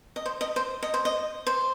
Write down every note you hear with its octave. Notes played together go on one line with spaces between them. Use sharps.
D#5
C5
D#5
C5
D#5
C5
D#5
C5